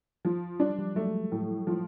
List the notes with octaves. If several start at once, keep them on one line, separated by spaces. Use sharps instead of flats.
F3
G3 D4
F#3
F3 G3
F#3 G#3 A3
A2
F3